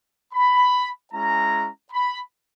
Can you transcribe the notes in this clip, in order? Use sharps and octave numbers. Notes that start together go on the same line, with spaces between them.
B5
G#3 C#4 E4 A#5
B5